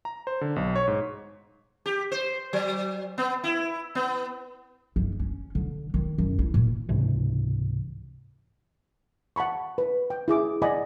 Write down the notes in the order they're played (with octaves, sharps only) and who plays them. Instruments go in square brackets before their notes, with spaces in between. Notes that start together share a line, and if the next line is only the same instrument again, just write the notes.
[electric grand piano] A#5
C5
D3
B1
C#5
G#2
[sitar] G4
C5
F#3
B3
E4
B3
[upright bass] G1
C#4
D3
D#3
F#2
E4
A#2
[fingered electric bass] C#2 G#2 C3 E3
[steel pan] F#5 A5 B5 C#6
B4
G5
E4 G#4 D6
D5 D#5 F#5 G#5 B5 D6